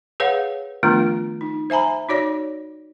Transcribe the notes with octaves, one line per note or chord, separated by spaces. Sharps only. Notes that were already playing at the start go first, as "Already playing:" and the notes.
G#4 B4 C#5 F5 F#5
D#3 F3 A3 B3 D4 F4
D#4
C5 E5 G#5 A#5 B5
D#4 F#4 C#5 D5